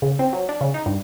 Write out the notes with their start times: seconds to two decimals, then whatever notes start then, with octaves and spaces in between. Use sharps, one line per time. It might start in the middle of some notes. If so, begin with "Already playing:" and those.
0.02 C#3
0.19 C4
0.33 F#3
0.49 D4
0.61 C#3
0.74 D#4
0.86 G2